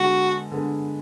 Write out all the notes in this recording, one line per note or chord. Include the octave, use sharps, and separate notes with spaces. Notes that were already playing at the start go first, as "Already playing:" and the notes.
Already playing: D3 G#3 B3 F#4
D3 G#3 B3